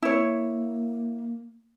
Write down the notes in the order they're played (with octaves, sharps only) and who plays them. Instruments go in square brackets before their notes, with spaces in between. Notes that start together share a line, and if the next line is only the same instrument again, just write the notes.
[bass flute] A#3 [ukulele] E4 C#5